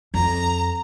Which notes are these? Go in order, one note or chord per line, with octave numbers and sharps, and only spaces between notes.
F2 A#5